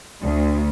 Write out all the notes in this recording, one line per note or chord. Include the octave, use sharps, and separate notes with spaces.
D2